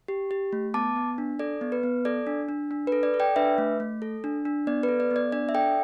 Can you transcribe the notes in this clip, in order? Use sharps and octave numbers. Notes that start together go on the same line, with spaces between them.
G4
G4
A3
B3 A5 D6
B3
D4
A4 D5
B3
B4
B3
A4 D5
D4
D4
D4
B4
A4
D5
A4
D5 G5
D4 B4 E5
A3
A3
A4
D4
D4
B3 D5
B4
A4
D5
B3
D5
D4 D5
E5
A4 D5 G5